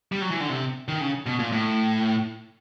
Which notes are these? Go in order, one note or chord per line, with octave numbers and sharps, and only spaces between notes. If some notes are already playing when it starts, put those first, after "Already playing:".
G3
F#3
E3
D3
C3
D#3
C#3
B2
A#2
A2